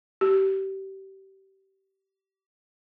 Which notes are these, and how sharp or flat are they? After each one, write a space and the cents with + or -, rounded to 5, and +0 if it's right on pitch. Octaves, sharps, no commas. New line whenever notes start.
G4 -25